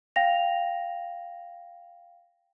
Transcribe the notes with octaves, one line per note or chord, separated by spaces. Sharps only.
F5 G5 A#6 F7